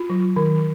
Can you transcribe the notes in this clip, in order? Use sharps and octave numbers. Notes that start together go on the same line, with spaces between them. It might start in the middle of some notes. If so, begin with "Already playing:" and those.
Already playing: F4
F#3
D#3